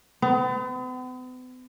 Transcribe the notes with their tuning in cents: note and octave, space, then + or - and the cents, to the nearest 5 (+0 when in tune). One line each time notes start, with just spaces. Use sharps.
B3 +45